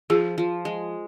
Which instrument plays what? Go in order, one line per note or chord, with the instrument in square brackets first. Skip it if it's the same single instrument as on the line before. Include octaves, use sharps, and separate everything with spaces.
[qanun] F3 [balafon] G#4
[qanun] F3
G#3